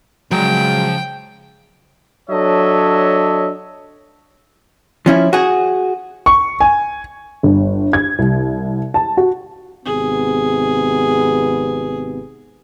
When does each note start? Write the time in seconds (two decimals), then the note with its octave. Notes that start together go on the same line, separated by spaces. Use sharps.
0.31 C#3 F3 F#3 G#3 G5 A#5
2.30 F#3 D4 A4 C#5 D#5 E5
5.06 F3 C#4 E4
5.33 F#4 G#4
6.26 C#6
6.60 G#5
7.43 G1
7.93 G#6
8.19 C2
8.94 A5
9.17 F#4
9.85 G#1 C3 B3 G#4